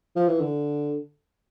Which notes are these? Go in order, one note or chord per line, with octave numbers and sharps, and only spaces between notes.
F3
E3
D3